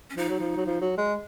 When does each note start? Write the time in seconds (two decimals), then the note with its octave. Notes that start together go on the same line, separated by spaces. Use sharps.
0.10 C#4
0.17 F3 D#4
0.29 F#3
0.40 F3
0.56 F#3
0.66 F3
0.81 F#3
0.97 G#3